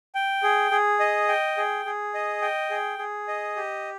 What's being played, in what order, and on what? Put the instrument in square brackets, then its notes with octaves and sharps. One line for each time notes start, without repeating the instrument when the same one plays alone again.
[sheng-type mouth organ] G5
G#4
G#4
D#5
G5
G#4
G#4
D#5
G5
G#4
G#4
D#5
G4